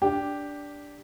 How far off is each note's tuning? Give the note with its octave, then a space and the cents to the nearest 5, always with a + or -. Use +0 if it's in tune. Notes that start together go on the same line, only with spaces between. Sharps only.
D4 -10 G4 +0